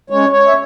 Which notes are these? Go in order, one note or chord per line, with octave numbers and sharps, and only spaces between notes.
G#3 C#4 C#5
C#5
E5